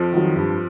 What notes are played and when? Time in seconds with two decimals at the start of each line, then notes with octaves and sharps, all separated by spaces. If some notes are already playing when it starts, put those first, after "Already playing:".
Already playing: F2 F3
0.12 D#3 F#3
0.35 G2